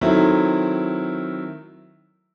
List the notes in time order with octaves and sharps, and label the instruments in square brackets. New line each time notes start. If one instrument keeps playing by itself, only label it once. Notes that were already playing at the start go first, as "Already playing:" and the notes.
[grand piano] D#3 F#3 A3 C4 E4